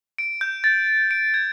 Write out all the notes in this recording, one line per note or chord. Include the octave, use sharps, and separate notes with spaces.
D7
G6
A6
D7
G#6